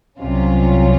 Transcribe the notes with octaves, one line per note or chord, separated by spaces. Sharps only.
C2 C3 F#3 C#4 F4